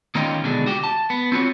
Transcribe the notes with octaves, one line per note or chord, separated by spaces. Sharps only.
D#3 A#3 C#4 F4 D#5 G5
D#2 B2 D3 G#3 D4
F#4 G4
A5
B3
C4 F4 F#4 C#5